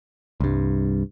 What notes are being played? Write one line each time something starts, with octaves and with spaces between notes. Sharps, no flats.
C2 G2